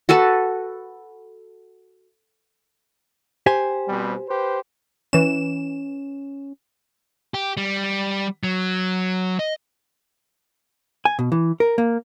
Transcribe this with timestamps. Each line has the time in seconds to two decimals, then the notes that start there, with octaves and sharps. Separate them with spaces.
0.09 F#4 A4 B4 A5
3.46 G4 C5 G#5
3.88 B2 G3 C4
4.28 G4 B4 C5
5.13 E3 C#4 E7
7.34 G4
7.57 G3
8.43 F#3
9.39 D#5
11.05 G#5
11.19 B2
11.32 E3
11.60 A#4
11.78 A#3